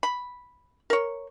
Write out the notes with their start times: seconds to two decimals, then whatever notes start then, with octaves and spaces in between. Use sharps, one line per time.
0.03 B5
0.90 A#4 C#5